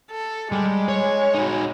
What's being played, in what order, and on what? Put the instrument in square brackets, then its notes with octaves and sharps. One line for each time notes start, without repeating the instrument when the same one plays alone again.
[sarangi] A4
[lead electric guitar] G3 [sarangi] G#3
[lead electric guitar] C#5
D#4 F#4